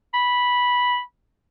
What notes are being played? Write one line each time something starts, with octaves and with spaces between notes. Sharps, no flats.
B5